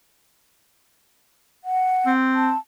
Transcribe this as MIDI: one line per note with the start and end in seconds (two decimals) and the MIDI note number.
1.64 2.11 78
2.06 2.52 60
2.35 2.58 81